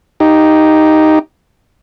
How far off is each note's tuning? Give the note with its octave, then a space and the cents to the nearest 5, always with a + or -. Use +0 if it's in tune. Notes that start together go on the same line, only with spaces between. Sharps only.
D#4 +0 G4 +0